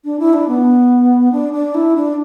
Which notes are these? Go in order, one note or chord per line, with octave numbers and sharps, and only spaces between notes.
D4
E4
D4
B3
D4
D4
E4
D4